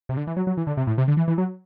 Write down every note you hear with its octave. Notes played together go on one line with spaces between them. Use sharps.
C3
D3
E3
F#3
F#3
E3
D3
C3
A2
C3
D3
E3
E3
F#3